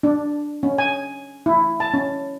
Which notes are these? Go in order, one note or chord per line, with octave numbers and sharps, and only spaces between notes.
D4
C#4
G#5
E4
A5
C#4